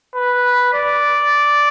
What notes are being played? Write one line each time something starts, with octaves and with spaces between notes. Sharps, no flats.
B4
D5